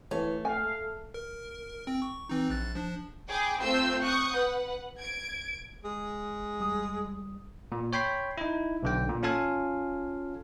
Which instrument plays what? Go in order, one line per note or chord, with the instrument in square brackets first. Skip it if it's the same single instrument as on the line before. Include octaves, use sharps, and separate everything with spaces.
[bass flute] E3 [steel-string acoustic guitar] A3 [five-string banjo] C#5
[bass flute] A4 [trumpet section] F5 [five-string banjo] G#5
[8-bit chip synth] A#4
C4 G5
C#6
E3 C4 D#4
A#1 F#6 A6
F3 D4
[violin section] G#4 G5 G#5 B5 D6
A3 C4 F4 C6 E6 G6
C#6 D#6 F#6 G6
B4 F#5
G#6 D7
[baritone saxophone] G#3
[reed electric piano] E2 G3 D#6
[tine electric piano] A#2
C#5 G5 B5 C6
D#4 E4
B1 D3 G5
A#2
C#4 F4 A4 F5 G#5